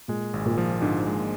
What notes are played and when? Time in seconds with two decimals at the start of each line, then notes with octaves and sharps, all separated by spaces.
0.08 A#2 G#3
0.33 G#1
0.46 A#2
0.58 F3
0.82 G#2 D3
1.06 G#3